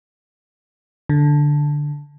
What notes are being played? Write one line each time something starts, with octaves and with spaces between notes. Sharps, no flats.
D3